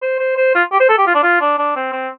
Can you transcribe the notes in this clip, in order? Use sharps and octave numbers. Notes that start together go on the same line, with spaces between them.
C5
C5
C5
F4
G4
C5
A4
G4
F4
D4
F4
D4
D4
C4
C4